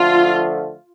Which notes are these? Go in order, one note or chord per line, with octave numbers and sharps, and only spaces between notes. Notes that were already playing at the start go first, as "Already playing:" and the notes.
Already playing: D3 F3 A3 F4